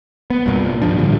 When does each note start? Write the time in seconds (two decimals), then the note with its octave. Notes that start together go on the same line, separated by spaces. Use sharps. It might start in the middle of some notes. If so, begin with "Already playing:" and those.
0.30 B3
0.46 C2 G2 A#2 A#3
0.82 G2 F3 D4
0.98 A2 D3 F3 G3